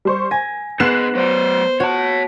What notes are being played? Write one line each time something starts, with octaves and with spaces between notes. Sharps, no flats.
G3 C5 C#6
G#5 A#6
B3 D#4 G#4 F#6 C7 E7
F#3 C5 D5
F#4 C#5 A5